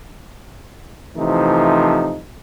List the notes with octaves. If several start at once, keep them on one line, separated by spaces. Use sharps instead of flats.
C3 E3 F3 A3 D#4